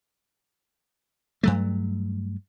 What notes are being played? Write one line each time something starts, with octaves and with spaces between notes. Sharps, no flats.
G2 F#3 A3